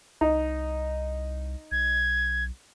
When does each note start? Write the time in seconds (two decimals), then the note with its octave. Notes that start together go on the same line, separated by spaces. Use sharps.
0.21 C2 D#4
1.72 B1 G#6